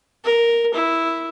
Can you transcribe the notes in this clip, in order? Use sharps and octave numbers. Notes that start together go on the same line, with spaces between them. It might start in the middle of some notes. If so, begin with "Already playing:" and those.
A#4
E4